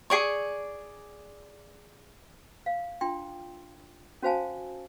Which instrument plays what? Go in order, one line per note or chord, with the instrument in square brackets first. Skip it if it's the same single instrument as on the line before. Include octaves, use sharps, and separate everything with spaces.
[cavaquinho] G#4 D5 C#6
[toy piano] F5
D4 F4 G5 C6
C#4 F#4 C5 F5 G#5 A5